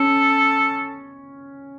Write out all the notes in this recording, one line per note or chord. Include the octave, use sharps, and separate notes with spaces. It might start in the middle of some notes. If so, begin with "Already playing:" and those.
Already playing: C#4 A4